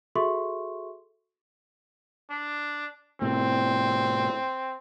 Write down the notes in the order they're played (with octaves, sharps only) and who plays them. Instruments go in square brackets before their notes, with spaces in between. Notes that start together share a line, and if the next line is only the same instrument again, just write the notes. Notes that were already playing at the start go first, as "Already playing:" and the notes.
[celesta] F#4 G#4 A4 E5 C6 C#6
[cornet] D4
[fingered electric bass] A2 C3 [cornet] C4